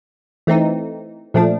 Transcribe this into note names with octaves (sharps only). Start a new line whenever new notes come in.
E3 A3 C4 D#4
A#2 F3 A3 D4